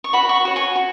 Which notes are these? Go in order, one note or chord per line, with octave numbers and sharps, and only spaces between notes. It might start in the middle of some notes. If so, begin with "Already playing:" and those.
C#6
F#4 C#5 F#5 B5
C#6
F#4 C#5
G#5 C#6
F#4